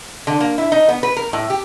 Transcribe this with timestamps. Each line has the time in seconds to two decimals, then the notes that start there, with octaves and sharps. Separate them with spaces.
0.27 D3
0.40 A#3
0.58 E4
0.72 D#4
0.89 B3
1.03 B4
1.17 A#4
1.33 A2
1.50 G4